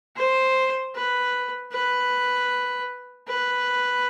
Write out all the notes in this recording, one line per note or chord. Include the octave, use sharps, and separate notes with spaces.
C5
B4
B4
B4